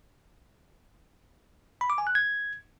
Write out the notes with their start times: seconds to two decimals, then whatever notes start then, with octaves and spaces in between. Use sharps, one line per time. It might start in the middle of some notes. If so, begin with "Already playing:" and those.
1.81 B5
1.90 D6
1.98 G#5
2.07 F#6
2.15 G#6